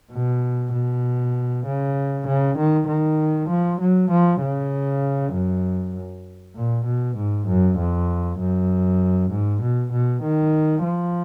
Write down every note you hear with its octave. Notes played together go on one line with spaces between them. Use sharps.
B2
B2
C#3
C#3
D#3
D#3
F3
F#3
F3
C#3
F#2
A#2
B2
G#2
F#2
F2
F#2
G#2
B2
B2
D#3
F3